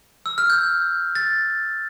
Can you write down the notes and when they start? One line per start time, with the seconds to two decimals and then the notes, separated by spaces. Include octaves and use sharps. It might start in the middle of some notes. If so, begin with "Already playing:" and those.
0.26 E6
0.38 F6
0.50 G6
1.15 A6